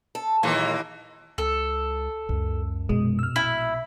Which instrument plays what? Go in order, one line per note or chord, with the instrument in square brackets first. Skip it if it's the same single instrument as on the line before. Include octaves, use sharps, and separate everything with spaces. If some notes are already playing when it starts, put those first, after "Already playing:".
[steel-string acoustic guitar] A4
[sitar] D#2 E3 A#3 [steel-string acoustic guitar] A#2 F#3 G#3
[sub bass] C#2 [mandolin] A4
[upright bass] C#2 [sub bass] F#2
[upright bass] A#1 B2 [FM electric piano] G#3
[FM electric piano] E6 F6
[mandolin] E4